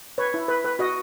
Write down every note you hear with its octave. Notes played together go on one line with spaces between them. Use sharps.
B4 C#5
E4
B4
B4
F#4 D#5